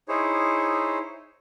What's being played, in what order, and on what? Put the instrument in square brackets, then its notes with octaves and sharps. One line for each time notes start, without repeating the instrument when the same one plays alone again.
[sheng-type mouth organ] D#4 E4 G#4 C5 C#5